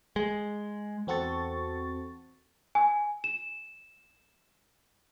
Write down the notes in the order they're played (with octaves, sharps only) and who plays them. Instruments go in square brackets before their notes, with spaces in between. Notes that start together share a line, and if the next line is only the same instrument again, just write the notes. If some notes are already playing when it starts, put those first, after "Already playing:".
[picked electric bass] G#3
[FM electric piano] E2 C4 F#4 A4 C#6 A6
[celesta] G#5
E7